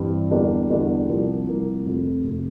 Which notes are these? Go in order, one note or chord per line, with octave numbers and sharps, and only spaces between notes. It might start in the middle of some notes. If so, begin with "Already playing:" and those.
Already playing: G2 E3 G3 C4
E2 D3 G3 A#3 D4
E2 D3 G3 A#3 D4
C2 C3 F3 A#3
C2 C3 F3 A#3
F1 F2 C3
F1 C3